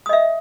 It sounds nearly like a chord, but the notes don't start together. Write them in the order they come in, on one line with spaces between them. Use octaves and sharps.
D#6 D#5 E5